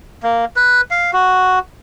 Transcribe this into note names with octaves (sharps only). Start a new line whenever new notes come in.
A#3
B4
F5
F#4